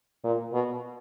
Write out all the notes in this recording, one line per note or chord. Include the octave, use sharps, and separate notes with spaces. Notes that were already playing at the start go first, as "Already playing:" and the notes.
A#2
B2